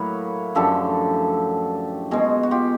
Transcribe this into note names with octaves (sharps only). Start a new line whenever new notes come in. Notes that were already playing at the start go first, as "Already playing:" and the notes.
Already playing: A2 F#3 A#3 B4 C#5
F#2 D3 F3 G4 A4
B2 G#3 F#4 G#4
F#4
F4 G4